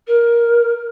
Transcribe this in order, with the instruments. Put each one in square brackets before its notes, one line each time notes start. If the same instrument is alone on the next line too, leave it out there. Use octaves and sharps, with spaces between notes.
[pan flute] A#4